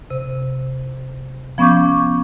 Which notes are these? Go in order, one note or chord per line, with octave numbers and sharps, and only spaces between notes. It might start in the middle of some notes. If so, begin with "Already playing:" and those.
C3
F3 B3 C#4 C#6 D6 G6